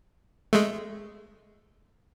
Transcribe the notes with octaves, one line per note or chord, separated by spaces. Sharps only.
G#3 A3